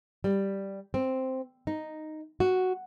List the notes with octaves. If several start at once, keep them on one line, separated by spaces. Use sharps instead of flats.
G3
C4
D#4
F#4